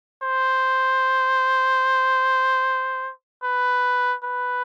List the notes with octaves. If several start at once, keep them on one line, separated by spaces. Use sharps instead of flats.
C5
B4
B4